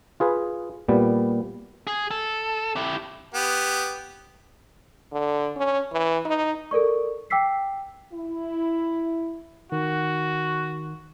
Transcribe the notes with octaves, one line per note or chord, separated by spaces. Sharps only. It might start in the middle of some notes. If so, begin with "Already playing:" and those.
F4 G#4 B4
A#2 G3 B3
G#4
A4
E4 G4
B3 G4
D3
C#4
E3
D#4
A4 A#4 D5 C#6
G5 D6 E6 B6 C7
E4
D#3 F#4